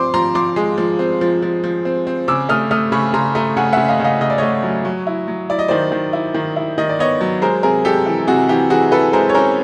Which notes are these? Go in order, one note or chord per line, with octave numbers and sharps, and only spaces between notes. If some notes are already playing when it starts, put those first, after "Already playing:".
Already playing: F3 C4 C6 D6
F3 A#5 C6
F3 C6 D6
G#3
F3
C4
F3
F3
F3
C4
C4
C#3 D6 E6
A3 D#6 F6
A3 D#6 F6
C#3 B5 C#6
C#3 A#5 C6
A3 G#5 A#5
C#3 F#5 G#5
C#3 E5 F#5
D#5 F5
C#3 D#5 F5
C#3 D#5
D5
A3 C#5 D#5
F#3
F#3
E4
F#3
E4 D5
D#5
D#3 C5 D5
D#3
E4
D#3
E4
D#3 D#5
D5
B3 C#5 D#5
F#3
G#3 A#4 C5
C3 G#4 A#4
G#3 G4 A4
E3
C3 F#4 G#4
E3 G4
E3 F#4 G#4
E3 A4 B4
G#3 A#4 C5
C#5
C#4 A#4 C5